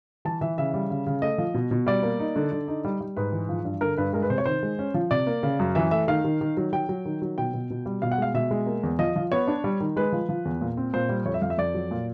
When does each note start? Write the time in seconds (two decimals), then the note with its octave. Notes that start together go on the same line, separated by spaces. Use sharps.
0.25 E3 A5
0.41 E3 E5
0.58 C#3 E5
0.74 G3
0.90 C#3
1.06 C#3
1.22 A3 D#5
1.38 F3
1.54 B2
1.71 B2
1.86 G3 D5
2.03 A#3
2.19 D#4
2.36 D3
2.52 D3
2.68 D#4
2.85 G3
3.01 G3
3.17 G#2 B4
3.32 E3
3.49 F3
3.65 G2
3.81 D3 A#4
3.97 G2 B4
4.13 G#3 A#4
4.22 B4
4.30 C3 C5
4.38 C#5
4.46 D#3 C5
4.63 G#3
4.79 C#4
4.94 F3
5.11 C3 D5
5.27 A#3
5.43 C#3
5.59 F#2
5.75 E3 E5
5.91 A3 E5
6.08 D#3 F5
6.24 D#3
6.41 D#3
6.57 F#3
6.73 F#3 G5
6.89 F#3
7.05 D#3
7.22 F#3
7.38 B2 G5
7.54 B2
7.70 B2
7.86 G3
8.02 B2 F5
8.11 F#5
8.18 G#3 F5
8.34 B2 E5
8.51 G#3
8.66 A#3
8.83 E2
8.99 F3 D#5
9.16 F3
9.32 B3 C#5
9.47 D4
9.64 G3
9.80 D#3
9.96 G#3 B4
10.12 F3
10.29 F3
10.45 E2
10.61 A#2
10.77 C4
10.93 A#2 C5
11.09 G3
11.25 F2 C#5
11.34 E5
11.42 F2 F5
11.50 E5
11.58 F2 D5
11.74 F#3
11.91 A#2